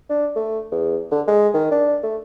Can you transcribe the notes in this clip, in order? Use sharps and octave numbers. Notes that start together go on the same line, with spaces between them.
D4
A3
E2
D3
G#3
D#3
D4
A3